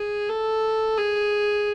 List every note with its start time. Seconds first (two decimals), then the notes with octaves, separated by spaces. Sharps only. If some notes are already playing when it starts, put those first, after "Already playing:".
Already playing: G#4
0.29 A4
0.97 G#4